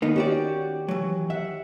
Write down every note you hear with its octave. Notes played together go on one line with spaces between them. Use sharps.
D#3 A#3 B3 D#4
C#4 F#4 G4 D5
E3 F#3
E5 F#5